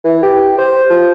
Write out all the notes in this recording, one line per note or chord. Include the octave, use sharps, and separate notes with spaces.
E3
G4
C5
F3